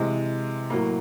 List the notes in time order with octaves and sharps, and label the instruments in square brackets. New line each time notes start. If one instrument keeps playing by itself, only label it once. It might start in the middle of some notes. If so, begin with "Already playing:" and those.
Already playing: [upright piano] C3 E3 G#3
A2 F#3 A#3